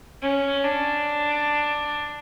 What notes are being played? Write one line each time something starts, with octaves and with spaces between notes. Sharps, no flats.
C#4
D4